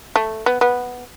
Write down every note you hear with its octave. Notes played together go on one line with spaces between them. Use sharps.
A3
B3
B3